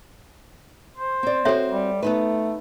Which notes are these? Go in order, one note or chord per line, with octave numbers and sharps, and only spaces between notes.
C5
C4 D5
C4 F#4 A4 C#5 E5
G3
A3 B3 D#4 B4